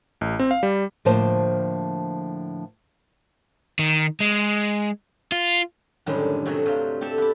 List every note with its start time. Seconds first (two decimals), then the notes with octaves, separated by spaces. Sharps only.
0.21 A1
0.39 C4
0.51 F5
0.63 G3
1.05 A2 D3 F3 A#3 C5 A5
3.79 D#3
4.20 G#3
5.32 F4
6.06 F#2 A2 D3 D#3 G3 G#3
6.46 C3 F#3 A3 F#4 G#4
6.66 G2 C3 F#3 F4
7.01 C4 G4 A4 E5
7.18 B3 D5